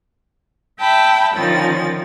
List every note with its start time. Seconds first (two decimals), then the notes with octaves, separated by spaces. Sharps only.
0.80 E5 G5 A5 B5
1.36 D3 D#3 F3 C#4 A6